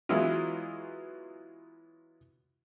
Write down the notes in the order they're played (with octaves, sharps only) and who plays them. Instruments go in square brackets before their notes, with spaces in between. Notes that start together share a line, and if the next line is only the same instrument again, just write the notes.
[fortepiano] E3 F#3 G#3 B3 E4 F4